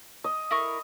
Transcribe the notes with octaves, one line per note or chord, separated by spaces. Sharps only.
D#5
E4 A#4 C#6